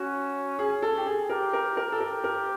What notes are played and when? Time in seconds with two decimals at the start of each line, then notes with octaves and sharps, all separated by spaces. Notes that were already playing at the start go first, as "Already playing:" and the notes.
Already playing: C#4 F#4
0.59 G#4
0.82 A4
0.98 G4
1.06 G#4
1.29 G4 A#4
1.53 A#4
1.77 A#4
1.92 A4
2.00 G4 A#4
2.24 A#4